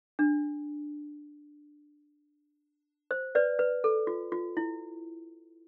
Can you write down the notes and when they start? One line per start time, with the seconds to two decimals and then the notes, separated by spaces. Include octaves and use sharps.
0.19 D4
3.11 C5
3.35 B4 D5
3.59 B4
3.84 A4
4.07 F4
4.32 F4
4.57 E4